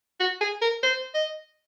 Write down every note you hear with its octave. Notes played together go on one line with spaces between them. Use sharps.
F#4
G#4
A#4
C5
D#5